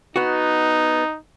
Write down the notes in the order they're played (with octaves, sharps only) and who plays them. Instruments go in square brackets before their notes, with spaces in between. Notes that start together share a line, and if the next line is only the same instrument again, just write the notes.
[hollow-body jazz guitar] B3 F#4 [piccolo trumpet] D#4